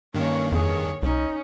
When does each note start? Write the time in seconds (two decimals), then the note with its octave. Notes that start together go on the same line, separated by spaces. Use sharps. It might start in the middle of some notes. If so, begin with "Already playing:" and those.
0.15 G2 D#3 A#3 C#4 C#5
0.52 F2 G#4 C#5
1.03 C2 C#4 D#4